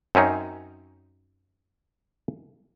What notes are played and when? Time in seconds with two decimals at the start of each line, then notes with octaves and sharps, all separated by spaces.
0.15 F#2 C4 C#4 D#4